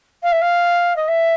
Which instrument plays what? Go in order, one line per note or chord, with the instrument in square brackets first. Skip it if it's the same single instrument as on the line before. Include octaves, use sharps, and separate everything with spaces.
[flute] F5
E5
F5
D#5
E5